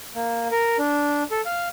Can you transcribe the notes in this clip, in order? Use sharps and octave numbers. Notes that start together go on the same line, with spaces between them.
A#3
A#4
D4
A4
F5